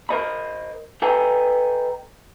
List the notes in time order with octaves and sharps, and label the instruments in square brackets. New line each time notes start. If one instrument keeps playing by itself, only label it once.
[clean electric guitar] A#4 C5 D#5 B5
A4 B4 D#5 G5 G#5 A#5